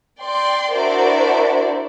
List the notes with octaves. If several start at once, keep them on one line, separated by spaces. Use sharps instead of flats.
D5 G5 C6
D4 E4 F#4 A#4 C5 D5